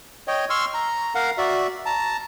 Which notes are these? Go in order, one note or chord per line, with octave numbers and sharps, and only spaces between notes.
C#5 D#5 G5
C6 C#6 E6 F6
A#5
A#4 F5 F#5 A#5
F#4 D5 E5
A5 A#5